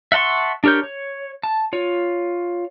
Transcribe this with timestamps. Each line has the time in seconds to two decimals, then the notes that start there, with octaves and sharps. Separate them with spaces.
0.12 E5 F#5 A5 C6 C#6
0.64 D4 G4 A#4 C#5 G6
0.83 C#5
1.43 A5
1.73 F4 C#5